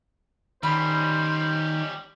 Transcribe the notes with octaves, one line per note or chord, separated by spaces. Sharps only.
D#3 G3 C#4 C5 B5